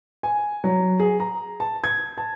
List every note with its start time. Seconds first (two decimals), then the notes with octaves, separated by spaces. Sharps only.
0.23 G#5
0.64 F#3
1.00 G#4
1.20 A#5
1.60 A5
1.84 G#6
2.18 A5